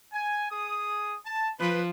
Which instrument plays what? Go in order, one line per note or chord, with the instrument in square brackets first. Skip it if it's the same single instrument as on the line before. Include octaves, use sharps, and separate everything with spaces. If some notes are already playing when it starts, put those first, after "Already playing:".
[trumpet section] G#5
G#4 D#6
A5
[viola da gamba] F3 [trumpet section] B4